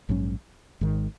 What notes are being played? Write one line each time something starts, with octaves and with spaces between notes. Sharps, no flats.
A#1 G#2 F#3 C#4
G#1 G#2 D#3